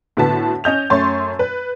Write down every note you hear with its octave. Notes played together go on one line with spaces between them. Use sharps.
A2 D3 B3 F#4 A5 B6
C#4 D#5 G6 F7
F#2 A3 C#5 C6 C#6 A6
B4